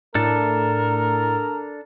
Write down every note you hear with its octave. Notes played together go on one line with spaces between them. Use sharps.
A2 D4 A4 A#4